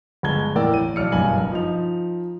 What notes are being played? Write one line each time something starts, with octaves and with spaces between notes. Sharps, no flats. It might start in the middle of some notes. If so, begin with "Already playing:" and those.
G1 G#3 A5 G#6 G7
E2 A2 A#4 D5 G5 E6
A1 D#7
B1 D5 F6 C#7
F#1 B1 G2 G#5 F#7
F3 D#4 F7